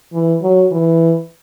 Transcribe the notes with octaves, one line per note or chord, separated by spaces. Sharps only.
E3
F#3
E3